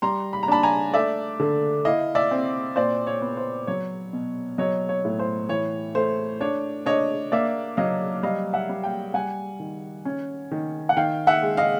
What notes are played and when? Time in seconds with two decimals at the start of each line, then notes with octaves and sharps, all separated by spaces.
0.02 G3 A#5 C6
0.33 B5
0.43 A#5
0.48 D4 A5 B5
0.63 G#5 A#5
0.94 A3 D5 E5
1.40 D3
1.85 E4 D#5 F5
2.15 D5 E5
2.31 C4
2.76 A#2 C5 D5
3.07 C#5
3.22 B3
3.37 C5
3.67 F#3 C#5
4.13 B2
4.58 F#3 C#5 D#5
4.89 C#5
5.05 A2
5.19 C5
5.49 E3 C#5
5.95 A3 C5
6.41 D4 C#5
6.86 D4 C#5 D#5
7.32 A#3 D5 E5
7.77 F#3 D#5 F5
8.23 G3 D#5 F5
8.53 E5 F#5
8.69 G3
8.83 F5 G5
9.14 G3 F#5 G#5
9.60 D#3
10.05 C#4
10.51 D#3
10.89 F#5
10.97 D#3 F5 G5
11.27 E5 F#5
11.42 G#3
11.57 D#5 F5